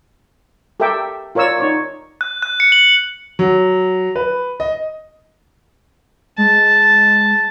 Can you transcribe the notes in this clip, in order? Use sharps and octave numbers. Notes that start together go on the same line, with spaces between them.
G4 A4 A#4 E5 G5 D6
F4 A#4 C#5 D5 E6
D#4 C#5 D5
F#6
F#6
C#7
F#7
F#3
B4
D#5
G#3 A5